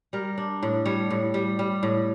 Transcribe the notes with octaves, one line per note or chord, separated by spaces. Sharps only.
G3 A#4
D4
A2
G3 C#5
A2
G3
G3
A2